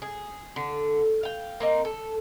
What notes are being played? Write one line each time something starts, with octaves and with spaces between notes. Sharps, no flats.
G#4
D3
F5 G5
A#3 C4 D#4
A4